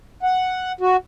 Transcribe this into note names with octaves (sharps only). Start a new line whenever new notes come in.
F#5
F#4